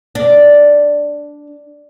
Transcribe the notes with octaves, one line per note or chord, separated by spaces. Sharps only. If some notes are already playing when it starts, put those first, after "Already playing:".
D4